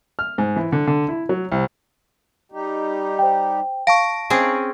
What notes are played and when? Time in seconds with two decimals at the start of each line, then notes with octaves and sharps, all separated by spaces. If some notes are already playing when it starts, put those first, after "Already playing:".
0.19 F6
0.38 G#2
0.56 E3
0.72 D3
0.87 D3
1.08 E4
1.29 F#3
1.52 C2
2.52 G3 D#4 G4
3.19 C5 G5
3.87 F5 A5 C#6 A#6 D7
4.30 C4 C#4 D#4 G#4